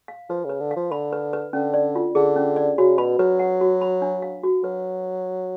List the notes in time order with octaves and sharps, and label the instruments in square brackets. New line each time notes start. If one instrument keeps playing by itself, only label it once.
[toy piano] F5
[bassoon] F3 [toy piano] B4
[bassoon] C#3 [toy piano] B4
[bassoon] D3
[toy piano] F5
[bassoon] F3
[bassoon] D3 [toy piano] B5
[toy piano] B4
B4
[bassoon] D3 [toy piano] C#4
[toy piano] D5
F4
[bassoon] D3 [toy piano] G#4
[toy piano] C#4
D5
[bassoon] C#3 [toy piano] F#4
[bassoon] B2 [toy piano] B5
[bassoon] F#3 [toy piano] B4
[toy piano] F#5
F#4
B5
D4
F5
F#4
[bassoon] F#3 [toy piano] B4